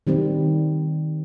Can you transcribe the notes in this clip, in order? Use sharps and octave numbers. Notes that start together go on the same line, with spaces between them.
D#3 G3 C4